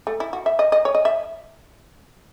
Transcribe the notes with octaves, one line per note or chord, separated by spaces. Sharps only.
A3
E4
F#4
E5
D#5
D#5
C#5
D#5
E5